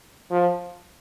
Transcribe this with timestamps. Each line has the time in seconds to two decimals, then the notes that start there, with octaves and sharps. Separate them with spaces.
0.31 F3